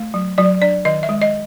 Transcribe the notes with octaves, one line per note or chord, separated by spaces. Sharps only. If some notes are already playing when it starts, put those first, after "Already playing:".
Already playing: A3
F#3
F#3 D5
D4 D5
D#3 D#5
E5
G#3
D#5